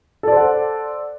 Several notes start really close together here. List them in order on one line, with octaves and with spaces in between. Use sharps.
A4 D5 C5 F#5